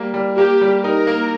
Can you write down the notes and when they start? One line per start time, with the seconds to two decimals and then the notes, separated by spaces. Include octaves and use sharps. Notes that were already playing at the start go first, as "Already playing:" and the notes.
Already playing: G3 A#3
0.14 G3
0.37 A#3 G4
0.61 G3
0.84 D#4 A#4
1.07 A#3